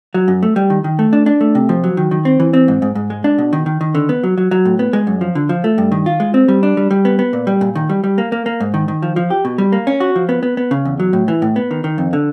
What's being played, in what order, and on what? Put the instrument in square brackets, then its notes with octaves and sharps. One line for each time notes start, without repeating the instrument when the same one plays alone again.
[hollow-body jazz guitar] F#3
F#2
A3
G3
D#3
D#3
A3
D4
D4
A3
C3
F3
F#3
D#3
D#3
C4
E3
C4
G#2
G#2
G#2
G#3
D4
B2
D#3
D#3
D#3
D3
B3
F#3
F#3
F#3
A2
B3
G#3
F#2
F3
D3
F3
A3
G2
D#3
F4
G#3
C4
G3
D4
G3
G3
B3
B3
A#2
G3
A#2
D#3
G3
G3
A#3
A#3
A#3
G#2
D#3
D#3
F3
F3
G4
B2
G3
A#3
C#4
F#4
F3
B3
B3
B3
C#3
E2
F#3
A2
E3
A2
B3
D#3
D#3
F2
D3